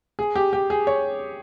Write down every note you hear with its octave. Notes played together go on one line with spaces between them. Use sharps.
G#4
G4
G4
G#4
C#5